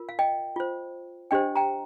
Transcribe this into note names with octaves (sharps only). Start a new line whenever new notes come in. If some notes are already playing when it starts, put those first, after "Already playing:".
Already playing: F4 A#4
F5
D#5 G5
F4 C5
D4 G4 C5 D#5 G5
G5 A#5